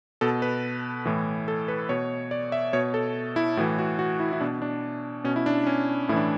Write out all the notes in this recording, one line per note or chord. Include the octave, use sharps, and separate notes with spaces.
B2 A4
B4
A2 E3
A4
B4
B2 C#5
D5
E5
B2 C#5
A4
E4
A2 E3 F#4
F#4
F#4
E4
E4
B2 D4
D4
B2 C#4
E4
D4
C#4
A2 E3 D4 E4